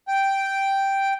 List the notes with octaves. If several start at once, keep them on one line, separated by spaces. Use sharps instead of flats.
G5